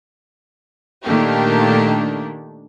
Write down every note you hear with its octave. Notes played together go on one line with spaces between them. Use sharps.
A#2 D#3 A3 A#3 D4 G4